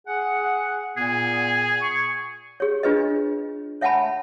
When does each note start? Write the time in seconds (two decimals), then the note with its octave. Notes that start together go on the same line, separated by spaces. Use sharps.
0.07 G#4 F#5
0.97 A#2 B3 G#4
1.81 C#6
2.60 G#4 C#5
2.83 D4 F4 G#4 B4 C#5 D#5
3.81 C#5 E5 F#5 G#5 A5 B5